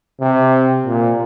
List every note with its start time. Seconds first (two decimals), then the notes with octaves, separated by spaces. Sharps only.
0.21 C3
0.86 A#2